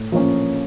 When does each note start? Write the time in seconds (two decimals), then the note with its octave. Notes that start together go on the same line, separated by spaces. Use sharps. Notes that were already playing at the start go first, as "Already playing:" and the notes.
Already playing: A2
0.12 F3 A#3 C#4